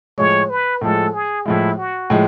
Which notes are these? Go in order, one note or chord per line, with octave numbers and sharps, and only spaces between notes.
A2 F3 G#3 C#5
B4
A2 F3 G#3 A4
G#4
A2 F3 G#3 E4
F#4
A2 F3 G#3